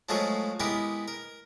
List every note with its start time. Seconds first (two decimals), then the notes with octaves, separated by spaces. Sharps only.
0.09 F3 F#3 G#3 A3 F4 A4
0.60 G#3 B3 E4 G4 A#4
1.08 A#4